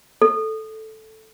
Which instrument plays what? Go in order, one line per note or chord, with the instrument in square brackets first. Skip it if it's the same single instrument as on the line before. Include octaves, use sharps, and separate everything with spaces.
[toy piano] A4